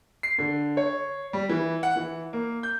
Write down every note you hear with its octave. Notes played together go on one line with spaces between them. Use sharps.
C7
D3
C#5
G3
E3
F#5
E3
A#3
G6